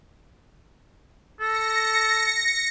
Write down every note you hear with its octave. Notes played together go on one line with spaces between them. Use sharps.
A4 A#6 C#7